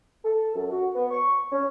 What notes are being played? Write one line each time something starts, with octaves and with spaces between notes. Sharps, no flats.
A4
F#2
F#4
B3
C#6
C#4